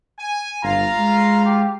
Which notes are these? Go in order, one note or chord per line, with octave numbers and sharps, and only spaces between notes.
G#5
G1 F4 F5 A#5
G#3
G4